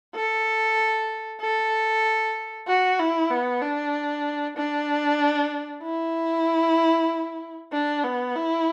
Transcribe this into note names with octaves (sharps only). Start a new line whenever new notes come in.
A4
A4
F#4
E4
B3
D4
D4
E4
D4
B3
E4